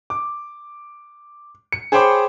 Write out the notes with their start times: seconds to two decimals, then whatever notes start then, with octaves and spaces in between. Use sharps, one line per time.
0.10 D6
1.72 C#7
1.92 G#4 C5 C#5 G5 B5 D6